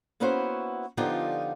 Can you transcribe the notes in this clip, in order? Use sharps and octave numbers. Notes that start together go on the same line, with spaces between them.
A#3 B3 C#4 E4 F#4 C5
D3 F3 B3 D#4 F4 G4